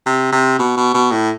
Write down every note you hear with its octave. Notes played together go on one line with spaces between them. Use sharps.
C3
C3
B2
B2
B2
A2